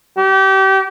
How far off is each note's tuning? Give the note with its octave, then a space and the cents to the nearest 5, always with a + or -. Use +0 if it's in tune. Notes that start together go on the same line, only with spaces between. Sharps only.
G4 -30